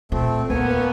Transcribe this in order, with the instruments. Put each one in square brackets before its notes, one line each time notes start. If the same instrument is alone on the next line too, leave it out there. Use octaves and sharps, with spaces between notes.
[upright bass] A#2 [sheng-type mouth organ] A3 C4
[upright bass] D#2 [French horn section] A#3 B3 [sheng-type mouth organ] C#4 C#5 G#5